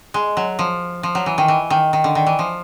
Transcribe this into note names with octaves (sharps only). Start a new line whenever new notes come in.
G#3
F#3
F3
F3
F#3
E3
D#3
E3
D#3
D#3
D3
D#3
E3
F3